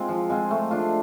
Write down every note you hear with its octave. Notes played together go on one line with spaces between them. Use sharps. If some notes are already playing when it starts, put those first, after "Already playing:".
Already playing: G#3 C4 F4
F3
G#3 C4 F4
A3
D4 F4